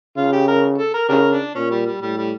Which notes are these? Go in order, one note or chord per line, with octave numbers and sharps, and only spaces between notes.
C#3 F4
G4
A#4
A4
A#4
C#3 D4 G4 A#4
D4
A#2 C#4
G3
G3
A2 G3
G3